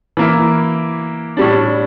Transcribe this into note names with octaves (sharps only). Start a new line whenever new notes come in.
E3 A#3 E4
A2 G3 D4